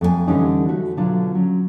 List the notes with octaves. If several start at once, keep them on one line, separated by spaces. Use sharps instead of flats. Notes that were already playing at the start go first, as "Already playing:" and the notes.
F2 A3 A4 G#5
D3 E3 G3 C#4 D#4
A3 F#4
B2 D3 F#3 D4 F4
F#3 C#4